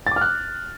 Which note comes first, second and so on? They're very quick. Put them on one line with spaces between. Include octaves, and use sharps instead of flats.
A6 D6 F6 F#6